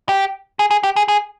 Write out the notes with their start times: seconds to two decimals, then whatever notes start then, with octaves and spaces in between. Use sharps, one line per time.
0.09 G4
0.59 G#4
0.71 G#4
0.83 G4
0.96 G#4
1.08 G#4